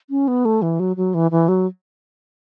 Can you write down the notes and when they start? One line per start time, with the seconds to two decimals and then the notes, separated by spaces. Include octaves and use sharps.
0.10 C#4
0.28 B3
0.45 A3
0.62 E3
0.80 F#3
0.96 F#3
1.14 E3
1.31 E3
1.48 F#3